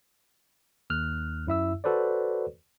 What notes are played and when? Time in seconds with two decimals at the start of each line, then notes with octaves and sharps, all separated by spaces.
0.90 D#2 F6 F#6
1.47 F#2 E4 E5 E6
1.84 F#4 A4 B4 C5 D5